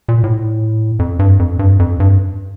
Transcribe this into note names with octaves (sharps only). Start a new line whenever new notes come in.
A#2
A2
F2
G2
F2
G2
F2
G2